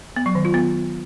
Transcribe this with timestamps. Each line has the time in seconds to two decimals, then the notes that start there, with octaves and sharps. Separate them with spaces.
0.16 B3
0.26 F#3
0.35 D#3
0.45 F4
0.54 B3